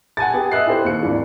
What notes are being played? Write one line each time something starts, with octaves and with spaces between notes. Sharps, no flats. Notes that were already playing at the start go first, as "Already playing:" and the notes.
F#5 G#5 A5 A6
B3 G4 G#4
D#5 E5 F#6 C7
E4 G4 A4 C5
D#2 C#7
G#1 E3 D4